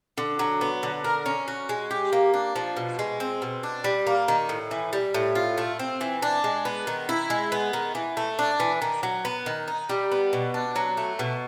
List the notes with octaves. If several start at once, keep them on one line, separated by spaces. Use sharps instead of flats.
D3
F#3
B3
D3
A#4
C#4
F#4
G#3
G4
A#3
D4
F3
B2
G#3
C4
B2
D4
G3
A#3
D#3
A2
E3
G3
A2
F4
A3
C4
E3
D4
G#3
B3
D#3
E4
G#3
B3
D#3
E3
A3
D4
E3
D#3
F#3
B3
D#3
D#4
G3
B3
B2
D4
F#3
A3
B2